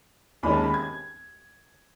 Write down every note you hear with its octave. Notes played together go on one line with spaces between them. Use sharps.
D#2 D#3 G#3 C#4 B5
A5
B5
G#6